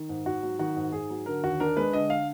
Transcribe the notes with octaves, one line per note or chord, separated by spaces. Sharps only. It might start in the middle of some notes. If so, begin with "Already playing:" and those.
Already playing: D#3
G#2
G#2 F#4
F#3
D#3 F#4
G#2
G#2 G#4
F#3
D3 A#4
D#2 F#4
D4 A#4
G#3 B4
D3 D#5
F5